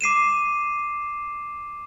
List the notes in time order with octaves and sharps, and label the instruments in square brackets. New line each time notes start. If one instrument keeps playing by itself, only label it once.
[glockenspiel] D6 C7 D#7 E7